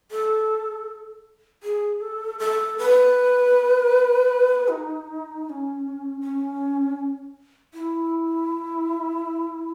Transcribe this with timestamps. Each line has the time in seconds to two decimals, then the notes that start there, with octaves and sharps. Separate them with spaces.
0.11 A4
1.63 G#4
2.01 A4
2.39 A4
2.78 B4
4.68 D#4
5.45 D#4
5.50 C#4
6.21 C#4
7.74 E4